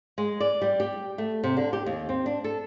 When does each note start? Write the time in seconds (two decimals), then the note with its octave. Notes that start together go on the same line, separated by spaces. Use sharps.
0.18 G#3
0.40 D5
0.62 G3
0.80 G4
1.18 A3
1.44 C3
1.57 D3
1.73 G4
1.86 D#2
2.09 C4
2.26 D4
2.44 A4